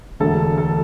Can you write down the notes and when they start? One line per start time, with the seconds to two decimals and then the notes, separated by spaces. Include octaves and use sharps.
0.20 E1 D2 D3 A3 A4
0.58 A4